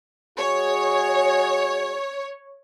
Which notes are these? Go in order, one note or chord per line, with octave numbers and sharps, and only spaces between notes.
G#3 F#4 G#4 C#5